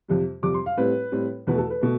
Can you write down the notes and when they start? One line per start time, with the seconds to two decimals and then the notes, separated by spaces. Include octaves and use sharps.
0.08 F2 C3 G3
0.43 F2 C3 G3 D6
0.54 C6
0.66 F5
0.77 A2 G3 C4 B4
1.12 A2 G3 C4
1.47 E2 B2 A3 B4
1.58 A4
1.70 B4
1.81 B2 A3